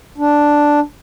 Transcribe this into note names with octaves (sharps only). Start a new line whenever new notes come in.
D4